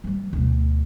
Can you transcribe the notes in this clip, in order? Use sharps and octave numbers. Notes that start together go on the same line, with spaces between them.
E3 G3
D2 B2